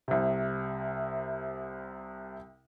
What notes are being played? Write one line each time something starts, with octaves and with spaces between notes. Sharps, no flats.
C2 C3